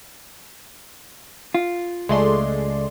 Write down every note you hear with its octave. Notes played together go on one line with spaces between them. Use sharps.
F4
C#2 G#3 A3 D5 C6